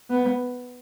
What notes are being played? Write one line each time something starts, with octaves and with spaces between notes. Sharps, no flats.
B3